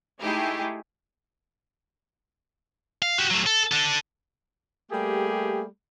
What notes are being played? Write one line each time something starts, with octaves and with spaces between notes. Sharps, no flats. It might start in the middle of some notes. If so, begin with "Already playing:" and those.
A3 D#4 E4 G4 G#4
F5
F#4 G4
F#3 A3
A4
D4 A4
G3 A3 A#3 G4 G#4